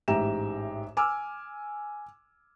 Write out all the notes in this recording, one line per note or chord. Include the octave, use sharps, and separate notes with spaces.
A1 G#2 G4 E5 A#5 E7
G#5 D6 E6 F6